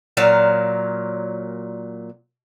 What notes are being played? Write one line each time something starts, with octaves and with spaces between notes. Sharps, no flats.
A#2 F#3 F5